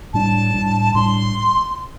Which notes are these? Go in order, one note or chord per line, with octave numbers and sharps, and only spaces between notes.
A2 G3 D4 A5
A2 G3 D4
A2 G3 D4 C6